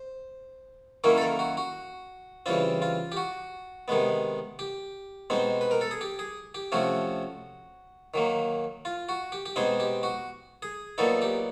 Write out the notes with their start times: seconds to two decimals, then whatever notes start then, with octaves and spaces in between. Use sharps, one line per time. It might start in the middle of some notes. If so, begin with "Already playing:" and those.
Already playing: C5
1.04 D#3 F#3 A#3 C#4 E4 A#4
1.18 A4
1.21 A#4
1.39 F#4
1.57 F#4
2.46 C#3 E3 G3 C4 F4
2.82 F4
3.12 G4
3.17 F#4
3.88 C3 D#3 G#3 B3
4.59 G4
5.30 B2 G#3 C4 D#4
5.61 B4
5.71 A#4
5.81 A4
5.91 G#4
6.01 G4
6.19 G#4
6.55 G4
6.72 C3 F3 A3 C#4 F#4
8.14 D#3 F#3 A#3
8.85 F4
9.09 F#4
9.32 G4
9.46 G4
9.56 B2 G#3 C4 D#4 G#4
9.80 G4
10.03 F#4
10.62 G#4
10.98 A#2 F#3 B3 D#4 A4
11.22 G4